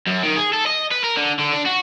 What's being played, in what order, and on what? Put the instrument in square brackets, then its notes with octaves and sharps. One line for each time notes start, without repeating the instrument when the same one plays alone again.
[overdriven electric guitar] F#2
D#3
G#4
A4
D#5
B4
A#4
D3
D3
D4
F#4